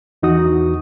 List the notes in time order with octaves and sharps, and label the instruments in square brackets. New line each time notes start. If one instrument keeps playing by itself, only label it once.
[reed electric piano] E2 E3 D#4 F#4 D#6